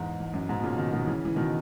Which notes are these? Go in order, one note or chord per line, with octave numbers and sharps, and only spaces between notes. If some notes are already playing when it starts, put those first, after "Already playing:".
Already playing: E2 G#2
E2
F#2
G#2 B2
B2
A#2 C#3
B2 D#3
B2 D#3
C#3 E3
E3
B2 D#3